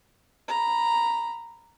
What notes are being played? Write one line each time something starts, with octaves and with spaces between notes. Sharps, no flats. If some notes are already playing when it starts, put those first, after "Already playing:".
A#5 B5